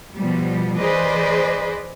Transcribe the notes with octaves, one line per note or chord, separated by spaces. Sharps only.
B2 F3 G3
E3 G#4 B4 C5 D5 D#5